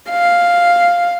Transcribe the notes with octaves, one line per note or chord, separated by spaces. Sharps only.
F5